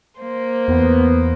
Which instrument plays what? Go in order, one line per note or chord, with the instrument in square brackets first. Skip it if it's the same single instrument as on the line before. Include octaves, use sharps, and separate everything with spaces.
[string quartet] A#3 C5
[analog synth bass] E2 [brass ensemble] B3